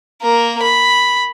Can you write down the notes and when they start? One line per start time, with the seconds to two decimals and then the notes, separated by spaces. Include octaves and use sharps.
0.22 A#3 A#4
0.62 B5